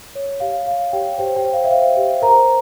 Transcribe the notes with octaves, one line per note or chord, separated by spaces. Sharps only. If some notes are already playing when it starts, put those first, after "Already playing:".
C#5
G4 F5
C#5 F5
G4 C#5 G5
G4 C5 G5
G4 G5
C5
F5
E5
C5 F5
G4
A#4 C5 A#5